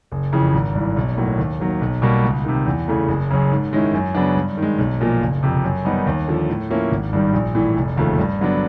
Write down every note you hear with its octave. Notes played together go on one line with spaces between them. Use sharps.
F#1
F2 C#3 E3
G#1
G2 E3
B1
A2 F#3 A#3
D#2
D#3 F#3 A#3
B1
B2 G3 A#3
C#2
C3 D#3
E2
C#3 E3 A3
F#1
F#2 C#3
G#2
D#3 G#3 C#4 E4
F#2
C#3 F#3 B3 D4
G2
D#3
G#3
B1
A#2 F3 A#3
F#1
F2 C3
F#2
D#3 G3 B3 D#4
D#2
D3 F3
A2
F3 A#3 C#4 E4
G#1
G2 D#3 G3
A#1
A2 E3
F1
D#2 C#3 F3 A3
G2
D3 F#3 B3 D4